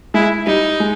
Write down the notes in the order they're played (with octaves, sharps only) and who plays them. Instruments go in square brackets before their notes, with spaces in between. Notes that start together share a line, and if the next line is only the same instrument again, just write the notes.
[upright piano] G#3 [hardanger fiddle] E4
[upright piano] G3 [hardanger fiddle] D#4
[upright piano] G#3